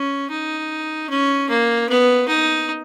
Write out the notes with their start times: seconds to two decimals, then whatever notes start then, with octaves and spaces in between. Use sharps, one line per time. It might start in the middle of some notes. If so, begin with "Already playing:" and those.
Already playing: C#4
0.30 D#4
1.09 C#4
1.49 A#3
1.89 B3
2.28 D#4